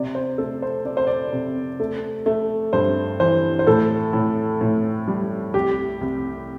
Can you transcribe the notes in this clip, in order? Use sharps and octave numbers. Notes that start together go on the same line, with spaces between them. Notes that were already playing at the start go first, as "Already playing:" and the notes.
Already playing: C3 D5
C5
A3 A4
C5
A3 D5
C5
D5
C3
A3
A3
G2 C5
E3 C5
C5
A2 A4
A2
A2
G3
C2 G4
C2